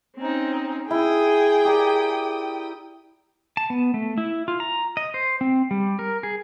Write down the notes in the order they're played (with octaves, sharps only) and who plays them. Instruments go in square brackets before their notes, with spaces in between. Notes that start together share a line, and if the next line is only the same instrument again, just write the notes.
[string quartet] C4 C#4 D#4
[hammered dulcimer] E4 [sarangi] G#4 [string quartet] G5 D#6
[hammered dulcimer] G4 A#4 D5
[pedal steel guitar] A5
B3
A3
E4
F4
A#5
D#5
C5
C4
G3
A#4
G#4